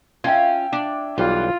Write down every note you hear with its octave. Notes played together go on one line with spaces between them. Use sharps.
C#4 F4 E5 G5 G#6
D4
B1 E3 G3 F4 F5